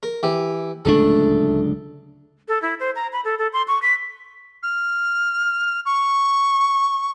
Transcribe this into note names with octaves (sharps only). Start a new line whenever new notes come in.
A#4
E3 G4
D1 C#2 A3 D4 A4
A4
E4
C5
A#5
B5
A4
A4
C6
C#6
B6
F6
C#6